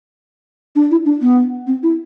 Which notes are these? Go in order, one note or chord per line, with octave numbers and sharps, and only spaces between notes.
D4
E4
D4
B3
C4
E4